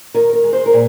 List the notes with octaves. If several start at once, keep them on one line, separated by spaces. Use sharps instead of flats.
D#3 A#4
A#4
G#3
C5
A#4
A#2